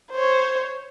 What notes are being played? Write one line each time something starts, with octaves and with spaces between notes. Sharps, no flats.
C5 C#5